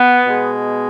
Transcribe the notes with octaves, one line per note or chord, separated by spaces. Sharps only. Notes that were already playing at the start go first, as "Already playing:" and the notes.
Already playing: B3
B2 G#3